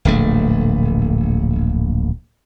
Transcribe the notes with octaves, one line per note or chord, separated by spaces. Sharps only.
D1 A#1 A3